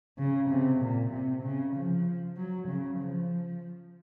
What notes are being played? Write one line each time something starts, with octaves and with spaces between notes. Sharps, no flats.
C#3
C3
A#2
C3
C#3
F3
F#3
C#3
F3